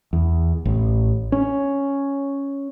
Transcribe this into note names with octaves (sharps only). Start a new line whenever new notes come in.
E2
A1
C#4